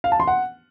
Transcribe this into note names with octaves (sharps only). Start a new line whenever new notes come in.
F5
A5
C6
F#5